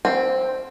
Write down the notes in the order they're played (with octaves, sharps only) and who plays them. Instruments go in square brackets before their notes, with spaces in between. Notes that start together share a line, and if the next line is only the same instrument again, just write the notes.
[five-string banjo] C4